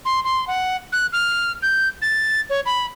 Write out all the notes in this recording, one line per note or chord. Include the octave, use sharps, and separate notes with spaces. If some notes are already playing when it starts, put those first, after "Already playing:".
C6
C6
F#5
F#6
F6
G6
A6
C#5
B5